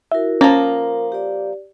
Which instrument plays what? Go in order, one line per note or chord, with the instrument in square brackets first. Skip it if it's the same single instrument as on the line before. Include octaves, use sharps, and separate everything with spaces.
[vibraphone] E4 F#4 A#4 [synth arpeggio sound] E5
[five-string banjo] F3 A#3 [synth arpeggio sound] C#4 A6 A#6 [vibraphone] A#4
[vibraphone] G4 D5